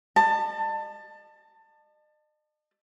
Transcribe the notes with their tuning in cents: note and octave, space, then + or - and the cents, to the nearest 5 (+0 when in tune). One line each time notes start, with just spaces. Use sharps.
D#5 -40 A5 +20